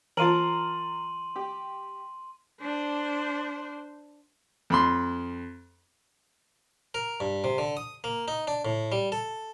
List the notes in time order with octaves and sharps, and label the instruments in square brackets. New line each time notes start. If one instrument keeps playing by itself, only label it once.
[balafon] E3 F4 [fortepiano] A#4 F5 A5 [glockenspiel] C6 D#7 F#7
[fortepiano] G4
[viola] D4 C5
[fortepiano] F2 B5 C6
[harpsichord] A#4
G2
C3
D3
D#6
A#3
D#4
D4
A2
G3
A4